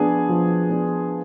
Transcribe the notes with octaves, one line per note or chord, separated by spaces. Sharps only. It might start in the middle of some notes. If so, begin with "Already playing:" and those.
Already playing: F3 B3 D4 G#4
F3
B3 D4